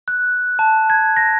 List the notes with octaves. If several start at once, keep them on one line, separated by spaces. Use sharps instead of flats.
F#6
A5
G#6
A#6